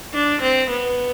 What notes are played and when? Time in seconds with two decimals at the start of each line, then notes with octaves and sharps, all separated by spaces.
0.14 D4
0.42 C4
0.71 B3